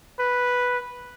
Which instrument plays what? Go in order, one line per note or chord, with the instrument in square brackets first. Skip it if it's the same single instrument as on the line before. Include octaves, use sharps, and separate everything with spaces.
[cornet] B4